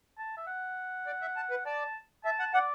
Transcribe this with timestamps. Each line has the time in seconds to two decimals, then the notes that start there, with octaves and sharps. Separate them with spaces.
0.18 A5
0.38 E5
0.47 F#5
1.07 D5
1.21 E5
1.36 A5
1.50 B4
1.66 D5 A5
2.24 E5 A5
2.39 F#5
2.54 D5 F#5